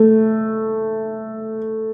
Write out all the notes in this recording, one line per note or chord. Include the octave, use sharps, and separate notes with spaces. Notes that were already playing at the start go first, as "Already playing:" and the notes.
Already playing: A3